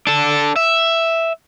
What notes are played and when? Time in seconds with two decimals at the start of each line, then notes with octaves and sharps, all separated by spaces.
0.07 D4 A4
0.56 E5